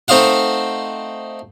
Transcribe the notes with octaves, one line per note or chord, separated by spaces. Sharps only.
A3 C4 D#4 F5 F#5